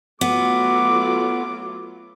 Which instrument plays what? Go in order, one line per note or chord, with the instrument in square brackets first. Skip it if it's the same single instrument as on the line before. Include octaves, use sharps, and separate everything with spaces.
[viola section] F#3 A3 F4 [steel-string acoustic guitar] B3 [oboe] D6